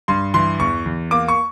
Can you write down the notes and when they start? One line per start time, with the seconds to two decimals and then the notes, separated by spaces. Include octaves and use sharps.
0.08 G2 C6
0.34 E3 C6
0.60 E2 C#6
0.86 E2
1.11 A#3 D6
1.28 C#6